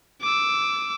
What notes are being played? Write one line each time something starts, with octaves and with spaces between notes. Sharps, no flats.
D6 E6